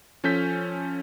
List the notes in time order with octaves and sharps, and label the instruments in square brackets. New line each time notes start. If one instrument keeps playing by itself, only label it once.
[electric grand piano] F3 C#4 A4 G6 B6